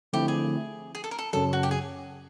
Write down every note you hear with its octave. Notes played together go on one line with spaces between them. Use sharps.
D3 F3 A3 C4 E4 G4
G#4
G#4
A4
A#4
A4
F#2 C#3 F#3 A4
F#4
G4
G#4